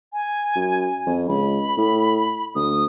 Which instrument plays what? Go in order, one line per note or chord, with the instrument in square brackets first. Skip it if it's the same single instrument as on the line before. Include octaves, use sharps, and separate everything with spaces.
[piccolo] G#5
[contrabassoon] F#2
F2
[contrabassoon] C#2 [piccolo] B5
[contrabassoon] A2
[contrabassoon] D2 [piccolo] D#6